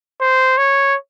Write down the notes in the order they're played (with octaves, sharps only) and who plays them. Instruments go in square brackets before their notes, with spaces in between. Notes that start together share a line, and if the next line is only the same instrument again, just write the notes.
[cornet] C5
C#5